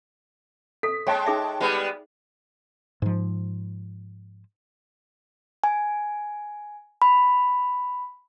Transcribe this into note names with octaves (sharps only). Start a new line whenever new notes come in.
A4 B6
G#3 C#5 G5 A5
D#4 G#4 E5
G3 G#3 B3
G#2 F3
G#5
B5